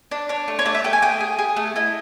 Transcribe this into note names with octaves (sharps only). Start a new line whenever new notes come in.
D4
D4 C#5
A3
C#5
A3 D5
E5
A3 G5
G#5
G#4 G5
G#4
G#4
A3
E4 D#5